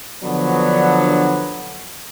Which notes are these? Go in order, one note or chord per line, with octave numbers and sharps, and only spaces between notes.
D3 F3 F#3 B3 D4